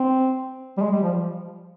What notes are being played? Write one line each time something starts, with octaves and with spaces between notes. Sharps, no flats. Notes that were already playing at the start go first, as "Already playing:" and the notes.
Already playing: C4
G3
G#3
G3
F3